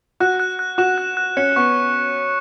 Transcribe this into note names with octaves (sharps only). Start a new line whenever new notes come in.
F#4 F#6
F#6
F#6
F#4 E7
F#6
F#6
C#4 C#7
B3 C#6